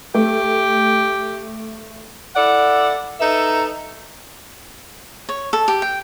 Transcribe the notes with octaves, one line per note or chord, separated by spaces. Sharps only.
A3 G4
E4 A4 D5 F#5
D#4 A4 B4 E5
C#5
A4
G4
G5